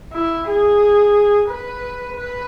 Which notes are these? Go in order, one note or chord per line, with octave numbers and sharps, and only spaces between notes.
E4
G#4
B4
B4